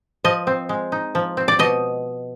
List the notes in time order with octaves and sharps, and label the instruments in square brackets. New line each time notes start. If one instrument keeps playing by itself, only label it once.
[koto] F3 D#5
C4
G#3
D#4
F3
C4
D5
B2 D#5